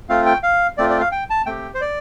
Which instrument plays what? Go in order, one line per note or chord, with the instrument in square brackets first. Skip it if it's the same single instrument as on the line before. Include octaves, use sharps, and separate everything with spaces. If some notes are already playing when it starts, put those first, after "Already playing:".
[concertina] A3 C4 F4 F5
G5
F5
A3 C4 F4 D5
D5
F5
G5
A5
A3 C4 G4 G5
C5
D5